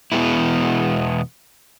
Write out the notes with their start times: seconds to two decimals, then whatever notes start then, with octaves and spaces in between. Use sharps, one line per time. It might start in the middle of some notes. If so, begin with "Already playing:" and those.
0.12 E2 B2 E3 G#3 B3 E4